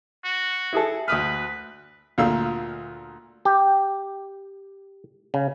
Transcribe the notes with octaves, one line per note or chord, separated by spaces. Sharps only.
F#4
E4 G#4 A4
D2 B4 D#6 F6
D2 A#2 F5 E6
G4
C#3